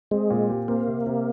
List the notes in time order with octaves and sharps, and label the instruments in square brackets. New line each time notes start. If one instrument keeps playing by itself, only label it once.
[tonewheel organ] G#3 [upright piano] C4
[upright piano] A#2
G4
[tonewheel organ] A#3 [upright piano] C4
[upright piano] C3
C3